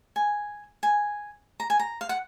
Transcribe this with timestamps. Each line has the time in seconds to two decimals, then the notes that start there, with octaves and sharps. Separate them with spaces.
0.16 G#5
0.83 G#5
1.60 A#5
1.70 G#5
1.80 A#5
2.01 F5
2.09 F#5